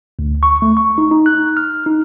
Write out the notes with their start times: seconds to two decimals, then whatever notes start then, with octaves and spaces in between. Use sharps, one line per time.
0.19 D2
0.43 C#6
0.62 A3
0.77 C#6
0.98 D#4
1.11 D#4
1.26 F#6
1.57 F6
1.86 D#4